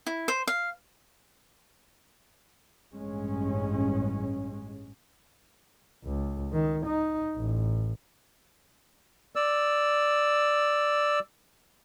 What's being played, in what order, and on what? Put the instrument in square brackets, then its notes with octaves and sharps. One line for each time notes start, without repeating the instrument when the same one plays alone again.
[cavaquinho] E4
C5
F5
[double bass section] A1 G2 G#3 C#4
[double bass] C#2
D#3
D#4
A1
[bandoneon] D5 E6